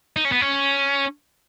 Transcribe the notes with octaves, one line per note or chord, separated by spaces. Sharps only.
D#4
C#4
B3
C#4